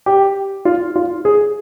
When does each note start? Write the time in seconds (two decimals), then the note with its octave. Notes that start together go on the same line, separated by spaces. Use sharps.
0.06 G4
0.65 F4
0.96 F4
1.25 G#4